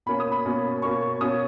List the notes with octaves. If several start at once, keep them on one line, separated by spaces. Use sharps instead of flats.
B2 A#3 C#4 B5
D#6
B5
B2 A#3 C#4
B2 A#3 C#4 C#6
B2 A#3 C#4 D#6